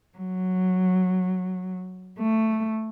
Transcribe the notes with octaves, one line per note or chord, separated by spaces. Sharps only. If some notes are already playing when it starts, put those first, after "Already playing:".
F#3
A3